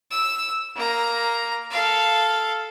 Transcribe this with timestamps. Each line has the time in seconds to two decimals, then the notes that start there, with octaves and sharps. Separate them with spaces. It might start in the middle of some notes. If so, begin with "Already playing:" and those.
0.11 E6
0.76 A#3 A#5
1.71 A4 F5